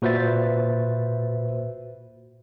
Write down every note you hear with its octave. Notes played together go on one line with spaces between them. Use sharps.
A#2 F#4 B4 C5 E5 A6